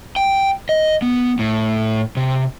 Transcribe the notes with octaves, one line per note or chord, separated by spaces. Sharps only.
G5
D#5
B3
A2
C3